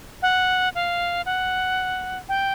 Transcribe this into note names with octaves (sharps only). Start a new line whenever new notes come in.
F#5
F5
F#5
G5